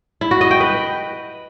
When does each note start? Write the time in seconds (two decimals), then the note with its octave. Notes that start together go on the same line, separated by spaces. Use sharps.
0.21 E4
0.31 F#4
0.41 D#5
0.51 G5
0.61 B4